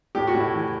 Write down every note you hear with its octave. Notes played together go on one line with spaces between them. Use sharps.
A2 G4
F#4
A2
E4
E3